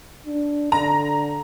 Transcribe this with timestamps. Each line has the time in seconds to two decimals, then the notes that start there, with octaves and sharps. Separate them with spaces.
0.26 D4
0.72 D3 A#5